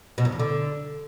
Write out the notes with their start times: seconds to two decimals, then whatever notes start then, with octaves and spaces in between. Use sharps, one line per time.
0.18 B2
0.25 F#2
0.32 E2
0.39 D3